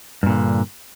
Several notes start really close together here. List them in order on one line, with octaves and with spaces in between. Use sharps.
G2 A#2 D3